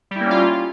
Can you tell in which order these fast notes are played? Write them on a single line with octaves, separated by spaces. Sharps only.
G3 E4 A#3 C#4 F4